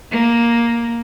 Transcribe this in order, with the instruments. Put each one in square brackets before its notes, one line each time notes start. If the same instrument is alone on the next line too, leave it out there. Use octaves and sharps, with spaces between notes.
[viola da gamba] A#3